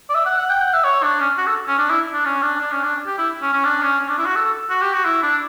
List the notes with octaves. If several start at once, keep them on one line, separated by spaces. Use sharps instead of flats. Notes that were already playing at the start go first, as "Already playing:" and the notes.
D5
E5
F#5
F#5
G5
F#5
E5
C#5
D4
C#4
F#4
A4
C#4
D4
E4
D4
C#4
D4
D4
C#4
D4
G4
E4
C#4
C#4
D4
C#4
C#4
D4
E4
F#4
A4
F#4
G4
F#4
E4
D4